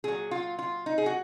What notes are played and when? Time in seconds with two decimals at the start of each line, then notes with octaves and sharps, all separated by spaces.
0.04 A#2 F#3 G#4
0.31 F4
0.59 F4
0.86 D#4
0.98 G#4
1.06 F#4